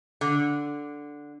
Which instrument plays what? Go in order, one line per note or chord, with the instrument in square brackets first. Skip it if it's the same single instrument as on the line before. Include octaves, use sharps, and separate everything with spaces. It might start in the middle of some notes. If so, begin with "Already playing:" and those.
[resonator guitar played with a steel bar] D3